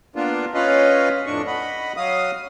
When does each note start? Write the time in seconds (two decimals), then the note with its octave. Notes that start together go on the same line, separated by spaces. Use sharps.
0.16 A#3 B3 D4 F4
0.54 C#4 F4 B4 D#5 F5
1.26 F2 A2 D4 C#6
1.47 D#5 F#5 B5
1.97 F#3 F5 D#6